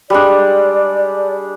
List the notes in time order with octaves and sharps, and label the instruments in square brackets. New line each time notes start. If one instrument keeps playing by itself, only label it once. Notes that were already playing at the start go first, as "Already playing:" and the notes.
[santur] G3 G#3 D4 [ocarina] D5